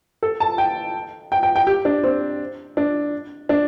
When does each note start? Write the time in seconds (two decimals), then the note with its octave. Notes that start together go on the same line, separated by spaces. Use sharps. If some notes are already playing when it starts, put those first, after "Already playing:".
0.23 A4
0.40 A5
0.58 G5
1.32 G5
1.43 G5
1.56 G5
1.67 G4
1.85 D4
2.04 C4
2.77 D4
3.49 D4